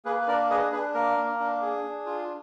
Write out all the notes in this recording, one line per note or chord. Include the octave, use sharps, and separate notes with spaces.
A#3 G#4 B4
B4
D4 A#4 D5
G#4 B4 D#5
D4 G#4 B4
A#3 A#4
A#3
D4
G#4
D4
F4